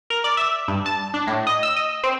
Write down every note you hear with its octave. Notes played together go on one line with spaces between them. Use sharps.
A#4
D5
E5
G2
A5
D4
A2
D#5
E6
D#5
C4